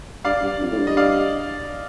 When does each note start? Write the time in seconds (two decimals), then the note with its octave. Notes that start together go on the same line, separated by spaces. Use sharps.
0.25 G2 D5 F5
0.43 G2
0.61 F2
0.72 A2
0.79 G2
0.87 D#5
0.97 D5 F5